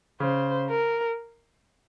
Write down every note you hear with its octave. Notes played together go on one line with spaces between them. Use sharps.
C#3 C5
A#4